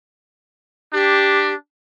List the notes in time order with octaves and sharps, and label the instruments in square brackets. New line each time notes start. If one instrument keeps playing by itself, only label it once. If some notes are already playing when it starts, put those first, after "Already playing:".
[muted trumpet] D4 [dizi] G4